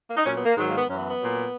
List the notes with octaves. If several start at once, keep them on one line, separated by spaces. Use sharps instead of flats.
A#3
D#4
A#2 F#3 C#4
B3
A#3
G#2 D#3 F#3 G#3
A#3
B3
F#2 E3 C#4
B3
B3
A#2 F#3